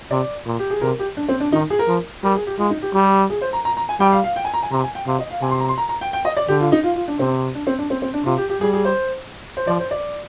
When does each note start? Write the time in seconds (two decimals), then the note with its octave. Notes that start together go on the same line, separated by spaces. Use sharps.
0.11 C3 D5
0.46 A#2
0.59 G4
0.70 G#4
0.81 C3 A#4
0.99 G4
1.17 D4
1.29 C4
1.40 D4
1.52 D#3 D#4
1.70 G#4
1.79 A#4
1.87 F3
2.23 G3 A#4
2.35 G#4
2.47 G4
2.58 G#3 F4
2.70 D#4
2.82 G4
2.94 G3 G4
3.30 G#4
3.41 C5
3.53 A#5
3.65 A#5
3.77 A#5
3.89 G#5
4.00 G3 G5
4.12 F5
4.24 F5
4.36 G5
4.45 G#5
4.54 A#5
4.63 G#5
4.71 C3 A#5
4.83 G#5
4.95 G5
5.06 C3 F5
5.19 D#5
5.31 F5
5.42 C3 G#5
5.51 C6
5.60 A#5
5.69 C6
5.78 A#5
5.89 A#5
6.01 G5
6.13 G5
6.25 D#5
6.37 D5
6.48 D3 G4
6.61 F4
6.72 D#4
6.84 F4
6.96 F4
7.08 D4
7.19 C3 C4
7.55 D4
7.67 C4
7.79 D4
7.90 C4
8.02 C4
8.14 D4
8.25 C3 F4
8.38 G4
8.50 G4
8.61 G3 G#4
8.73 G#4
8.85 C5
9.57 C5
9.67 F3 D5
9.79 C5
9.91 D5